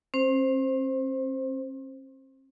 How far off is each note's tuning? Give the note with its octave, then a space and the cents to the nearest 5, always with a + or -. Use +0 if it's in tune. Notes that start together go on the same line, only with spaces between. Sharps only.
C4 +45 C5 +0